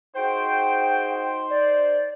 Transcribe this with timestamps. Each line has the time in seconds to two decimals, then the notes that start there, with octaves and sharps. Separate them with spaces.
0.16 D#4 F#4 G#4 C5 G5
1.50 D5